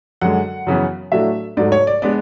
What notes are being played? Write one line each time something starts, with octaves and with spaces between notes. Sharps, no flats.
F#2 D3 G#3 F#5
F#2 C#3 E3 B3
A2 F#3 A3 D4 E5
G#2 F#3 A3 D5
C#5
D5
G#3 B3 D4 D5